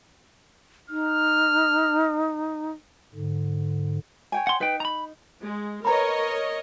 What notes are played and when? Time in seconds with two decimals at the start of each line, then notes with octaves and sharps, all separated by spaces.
0.90 D#4 F6
3.14 G#2 D3
4.32 C#5 G5 G#5
4.47 F#5 C6
4.61 D#4 B4 G5
4.80 A#5 B5
5.42 G#3
5.85 A#4 B4 C#5 D#5 A#5 B5